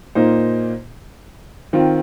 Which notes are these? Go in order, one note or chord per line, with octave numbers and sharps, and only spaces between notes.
A#2 A#3 D#4 C5
D#3 C4 F4